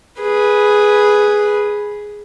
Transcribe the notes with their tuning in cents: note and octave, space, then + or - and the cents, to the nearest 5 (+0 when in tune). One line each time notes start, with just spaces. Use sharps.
G#4 +0 B4 -5